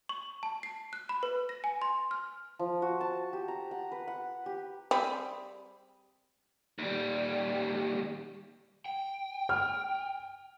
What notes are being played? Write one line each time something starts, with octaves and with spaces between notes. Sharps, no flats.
C#6
A5
C7
F#6
B5
B4
A#6
G#5
C6
F6
F3
F#4
A5
G4
A#5
F#5
B4
F#5
G4
G3 C4 G#4 B5
D#2 G3
G5
F6